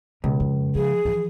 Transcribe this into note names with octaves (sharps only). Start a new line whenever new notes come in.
C#2 B2
F2
F3 G#4
E3 F3